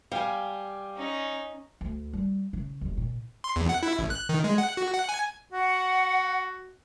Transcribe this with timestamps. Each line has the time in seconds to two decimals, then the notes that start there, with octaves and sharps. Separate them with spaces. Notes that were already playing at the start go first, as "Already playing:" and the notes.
0.12 G3 F5 G5 G#5
0.96 C#4 D#4
1.81 D2
2.13 G3
2.53 C#3
2.81 F#1 D#2
2.97 A#2
3.44 C6
3.56 E2
3.69 F#5
3.83 E4
3.99 A1
4.10 F#6
4.29 D#3
4.44 G#3
4.58 F#5
4.77 F#4
4.94 F#5
5.09 G#5
5.53 F#4 F#5